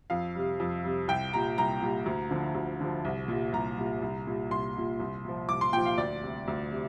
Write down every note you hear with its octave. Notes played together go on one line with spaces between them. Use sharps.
F2 F5
C3 G3
F2
C3 G3
C2 G5
A#2 G3 A#5
C2 A#5
A#2 G3
D2
D3 F3
D2
D3 F3
C2
A#2 G3
C2 A#5
A#2 G3
C2
A#2 G3
C2 C6
A#2 G3
C2
A#2 F3
C2 D6
C6
A#2 F3 G5
F5
D2 D5
C3 G3
D2
C3